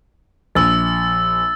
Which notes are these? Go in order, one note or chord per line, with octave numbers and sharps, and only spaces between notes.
A#1 E6 A6